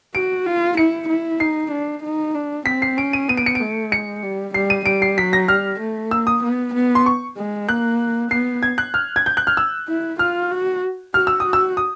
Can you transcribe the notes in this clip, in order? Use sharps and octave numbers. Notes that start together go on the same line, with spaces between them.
F#4 D7
F4
E4 C#7
E4
D#4 C7
D4
D#4
D4
C4 B6
C7
C#4 D7
D#7
B3 D#7
D7
C#7
D7
A3
G#3 C#7
G3
G3 C7
D#7
G3 D7
C7
F#3 B6
A#6
G3 F6
A3
A#3 E6
D#6
B3
B3
C6
C#6
G#3
A#3 F#6
B3 C7
G#6
F#6
F6
G#6
G6
F#6
F6
E6
E4
F4 F6
F#4
F#4 F6
E6
F#4 D#6
E6
D#6